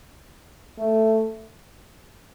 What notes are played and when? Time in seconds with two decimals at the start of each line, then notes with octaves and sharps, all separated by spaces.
0.79 A3